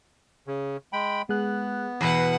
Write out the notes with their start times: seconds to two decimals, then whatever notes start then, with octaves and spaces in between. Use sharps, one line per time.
0.47 C#3
0.93 G#3 G5 B5
1.29 G#3 B3 G#4 F#6
2.01 E2 B2 B4 F#5 A#6 C7